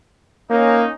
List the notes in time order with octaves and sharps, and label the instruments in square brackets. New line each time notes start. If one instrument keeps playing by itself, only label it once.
[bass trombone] A#3 [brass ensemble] C#4 D#4